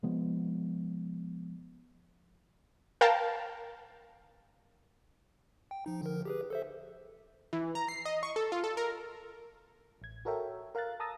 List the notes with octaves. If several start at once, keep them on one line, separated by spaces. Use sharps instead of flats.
C3 F3 G#3 B3
A#4 F5 G5 A5 A#5
G5
F3 D#4
D3 F3 A#4
G4 G#4 B4
A4 C5 E5
E3
A#5
C7
D#5
C#6
A4
F4
A4
A#4
A1 G#6
F#4 A4 A#4 C#5 E5 G5
A#4 F5 A#5 F#6 A6
A5 A#5 D#6 E6 A6 A#6